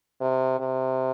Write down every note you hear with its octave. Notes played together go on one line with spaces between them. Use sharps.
C3
C3